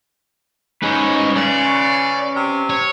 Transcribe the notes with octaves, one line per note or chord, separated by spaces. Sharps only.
G#3 C#4 D#4 B4
C#3 D5
C3
C#5